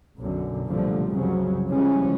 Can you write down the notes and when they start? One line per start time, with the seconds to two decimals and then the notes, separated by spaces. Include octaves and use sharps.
0.18 B1 F#2 D3
0.69 C2 A#2 D3 F3 G3 A3
1.08 C2 F#2 C#3 F3 F#3
1.69 C#3 E3 F3 G3 G#3 C#4